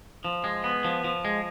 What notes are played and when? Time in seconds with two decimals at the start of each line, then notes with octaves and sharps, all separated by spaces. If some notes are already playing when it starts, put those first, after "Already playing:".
0.25 F3
0.44 G#3
0.64 B3
0.85 F3
1.04 F3
1.25 G#3